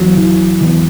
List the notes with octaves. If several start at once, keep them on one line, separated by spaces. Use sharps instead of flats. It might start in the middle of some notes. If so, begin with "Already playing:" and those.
Already playing: E2 F#3
E3
E2